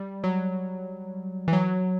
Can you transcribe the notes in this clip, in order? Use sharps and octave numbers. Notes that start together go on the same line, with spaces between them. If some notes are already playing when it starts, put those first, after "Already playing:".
Already playing: G3
F#3
E3
F#3